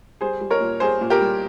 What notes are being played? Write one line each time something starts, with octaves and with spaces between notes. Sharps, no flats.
G3 G#4 C5
G3
A#4 C#5
A#2
G3 G#4 C5
A#2
G4 A#4
G3